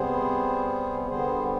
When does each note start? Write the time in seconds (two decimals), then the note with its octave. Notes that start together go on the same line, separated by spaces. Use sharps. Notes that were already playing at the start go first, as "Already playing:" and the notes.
Already playing: C3 G3 B3 G#4 C5
1.08 D3 G3 B3 G#4 C5